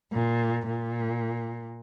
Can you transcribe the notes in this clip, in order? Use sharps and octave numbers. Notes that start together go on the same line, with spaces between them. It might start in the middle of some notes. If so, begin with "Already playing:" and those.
A#2
A#2